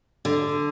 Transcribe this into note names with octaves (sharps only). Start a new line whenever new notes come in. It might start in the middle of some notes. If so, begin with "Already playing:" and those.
D3